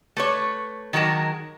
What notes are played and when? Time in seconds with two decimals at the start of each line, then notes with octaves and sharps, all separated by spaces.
0.17 A3 B4 C#5
0.93 D#3 F#3 G#3 A#4 A5